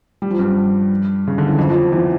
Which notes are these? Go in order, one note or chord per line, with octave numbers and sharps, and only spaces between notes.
G3
F3
G2 G3
C#3
D3
E3
F2 F3
F2 F3
E2 E3